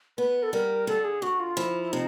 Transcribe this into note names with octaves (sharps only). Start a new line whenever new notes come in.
B3 B4
A4
G3 A#4
D3 A4
G#4
D3 F#4
F4
F3 E4
C3 D#4